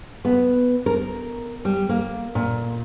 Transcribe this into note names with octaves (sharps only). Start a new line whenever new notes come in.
B3
A#4
G3
A#3
A#2